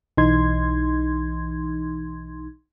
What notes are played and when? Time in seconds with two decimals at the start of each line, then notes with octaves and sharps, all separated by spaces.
0.17 B1 E3 D#4 C6 G#6